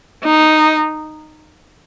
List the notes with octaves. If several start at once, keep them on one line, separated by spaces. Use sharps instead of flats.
D#4